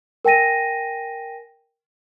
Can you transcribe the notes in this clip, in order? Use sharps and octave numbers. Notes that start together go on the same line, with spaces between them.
A#4 G5 G#5 A#6 D#7